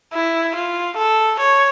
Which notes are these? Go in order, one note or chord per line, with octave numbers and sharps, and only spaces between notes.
E4
F4
A4
C#5